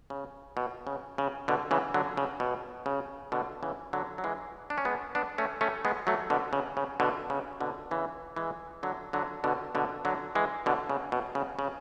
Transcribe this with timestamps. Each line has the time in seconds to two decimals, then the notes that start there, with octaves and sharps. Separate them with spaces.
0.10 C#3
0.57 B2
0.87 C#3
1.18 C#3
1.48 B2 D3
1.71 C#3 E3
1.94 D3 F#3
2.17 C#3
2.40 B2
2.86 C#3
3.32 B2 D3
3.63 C#3 E3
3.93 D3 F#3
4.18 F#3
4.24 E3 G#3
4.70 D4
4.78 C#4
4.85 G#3 B3
5.15 B3 D4
5.38 A3 C#4
5.61 A3 C#4
5.85 G#3 B3
6.07 F#3 A3
6.30 B2 D3
6.53 C#3
6.77 C#3
7.00 B2 D3
7.30 C#3
7.60 B2 D3
7.91 C#3 E3
8.36 E3 G#3
8.83 D3 F#3
9.13 D3 F#3
9.44 B2 D3
9.75 B2 D3
10.05 D3 F#3
10.35 E3 G#3
10.66 B2 D3
10.89 C#3
11.12 B2
11.35 C#3
11.59 C#3